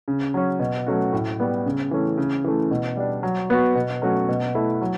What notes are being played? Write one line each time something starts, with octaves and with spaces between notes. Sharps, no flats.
C#3
F#3 C#4
B2
F#3 A3 C#4 F#4
A2
G3 B3
C#3
E3 A3 C#4
C#3
E3 A3
B2
G3 D4
F#3
B3 F#4
B2
F#3 A3 C#4 F#4
B2
A3 E4
F#3